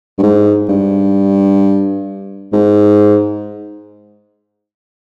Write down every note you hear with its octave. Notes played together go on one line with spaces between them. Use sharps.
G2
G#2
G2
G#2